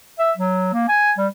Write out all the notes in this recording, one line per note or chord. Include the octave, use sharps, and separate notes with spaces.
E5
F#3
A#3
G#5
G3